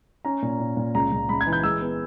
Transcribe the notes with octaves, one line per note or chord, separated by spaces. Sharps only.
C#4 A#5
A#2
A#2
A#2
C#2 A#5
C#2
C#2 B5
G#6
E3
G6
G#3 E6
B3